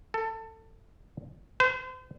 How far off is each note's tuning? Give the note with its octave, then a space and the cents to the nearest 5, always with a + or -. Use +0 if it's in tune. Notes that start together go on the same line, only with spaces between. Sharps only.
A4 +20
C5 -40